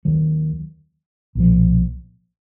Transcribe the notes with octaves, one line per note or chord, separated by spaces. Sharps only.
D#2 D#3 F#3
B1 A#2 F3